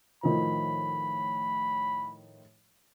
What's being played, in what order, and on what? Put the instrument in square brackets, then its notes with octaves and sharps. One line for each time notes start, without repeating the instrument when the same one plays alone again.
[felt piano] A2 D#3 F3 [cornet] B5